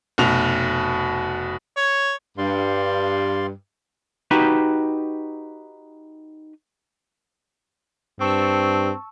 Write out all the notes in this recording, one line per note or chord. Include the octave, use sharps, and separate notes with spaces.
F1 B2 F7
C#5
G2 D5 F5 C6
D#4 F#4 G4 B4
G2 C4 A5 C#6 E6